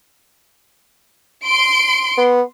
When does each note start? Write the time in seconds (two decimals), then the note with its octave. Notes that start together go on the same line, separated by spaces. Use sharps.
1.45 C6 D7
2.18 B3